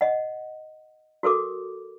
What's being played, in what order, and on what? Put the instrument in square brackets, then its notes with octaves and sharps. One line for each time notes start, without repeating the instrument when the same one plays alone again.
[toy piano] D#5 F#5
F#4 A4 A#4 D6